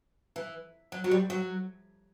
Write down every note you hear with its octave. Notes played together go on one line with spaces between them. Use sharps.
E3
F#3
F#3
G3
F#3